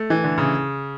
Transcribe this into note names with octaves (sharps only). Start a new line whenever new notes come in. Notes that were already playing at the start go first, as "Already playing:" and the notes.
Already playing: A3
E3
D3
C#3